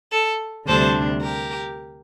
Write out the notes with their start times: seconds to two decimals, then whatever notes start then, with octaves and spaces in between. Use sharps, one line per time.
0.12 A4
0.68 D2 C3 G3 D4 A4 C5
1.22 G4 A#4